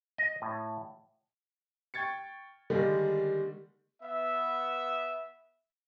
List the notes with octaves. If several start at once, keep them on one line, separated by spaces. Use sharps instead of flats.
D#5
A2
G5 C#6 G#6 A6 C#7
D3 D#3 G3 G#3 A#3
B3 E5